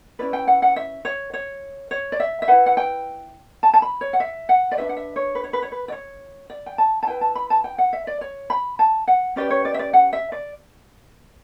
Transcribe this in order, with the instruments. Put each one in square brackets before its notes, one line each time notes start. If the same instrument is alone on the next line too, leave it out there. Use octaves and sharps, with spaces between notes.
[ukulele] C#4 E4 B4 D5
G5
F#5
F#5
E5
C#5
C#5
C#5
D5
E5
E5
E4 B4 F#5
F#5
G5
A5
A5
B5
C#5
F#5
E5
F#5
D5
D4 F#4 B4 E5
F#5
E5
C#5
B4
C#5
B4
C#5
B4
D5
C#5
D5
G5
A5
A5
E4 B4 G5
A5
B5
A5
G5
F#5
E5
D5
C#5
B5
A5
F#5
C#4 G4 B4 D5
C#5
D5
E5
D5
F#5
E5
D5